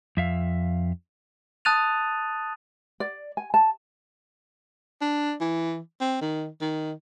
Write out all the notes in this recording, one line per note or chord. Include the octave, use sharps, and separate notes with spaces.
F2 E5 F5
A5 D#6 F#6 A6 D#7 F7
D5
G#5
A5
D4
E3
C4
D#3
D#3